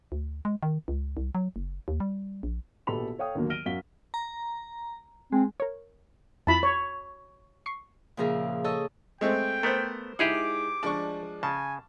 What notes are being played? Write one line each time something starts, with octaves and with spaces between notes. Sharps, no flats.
D2
G#3
D#3
C#2
C2
F#3
F#1
D#2
G3
A#1
A#1 B2 G4 A4 B5 F7
A4 C#5 F5 G5 D#6
D#2 D3 F#3 A#3
F6 A#6 D7 D#7 G7
F#2 F#4 F5 B6 G7
A#5
G#3 C4
A#4 C#5
F2 E4 F4 A5 B5
C#5
C#6 C7
A#2 C#3 F3 G#4 A#4 E5
A4 C#5 D#5 E6
G#3 A3 C4 G5
A3 B3 A#4 C5
G#3 D#4 E4 G4 G#4 F#5 D6
F3 G#3 D4 D5 C#6
C#3 G#5 A5